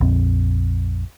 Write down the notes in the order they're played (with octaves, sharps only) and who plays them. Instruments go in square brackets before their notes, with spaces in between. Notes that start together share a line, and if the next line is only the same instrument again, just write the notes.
[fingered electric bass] A#1 F2 C4